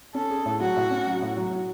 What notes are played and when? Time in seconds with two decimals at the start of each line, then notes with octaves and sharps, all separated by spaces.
0.14 C#4 A4
0.30 G#4
0.46 A2
0.61 F#3 F#4
0.76 A2
0.91 C#4
1.06 F#3
1.22 A2
1.37 F#3
1.51 F#3